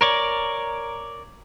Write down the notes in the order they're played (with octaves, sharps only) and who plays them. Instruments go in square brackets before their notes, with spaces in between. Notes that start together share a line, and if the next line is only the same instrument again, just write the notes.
[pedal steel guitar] A#4 C#5 D5